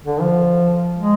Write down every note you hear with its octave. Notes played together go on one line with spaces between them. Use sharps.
D3
F3
G#3